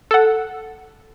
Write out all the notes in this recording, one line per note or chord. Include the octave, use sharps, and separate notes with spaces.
A4 F#5